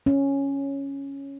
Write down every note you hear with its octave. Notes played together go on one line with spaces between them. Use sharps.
C#4